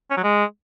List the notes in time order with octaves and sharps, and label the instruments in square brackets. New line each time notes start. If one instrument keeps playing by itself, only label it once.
[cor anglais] C#4
F#3
G#3